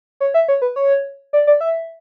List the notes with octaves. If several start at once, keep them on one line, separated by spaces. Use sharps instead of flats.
C#5
E5
C#5
B4
C#5
D5
D5
E5